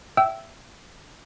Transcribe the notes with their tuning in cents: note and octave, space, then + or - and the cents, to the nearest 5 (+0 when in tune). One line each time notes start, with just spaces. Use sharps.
E5 +15 G5 -25 E6 +0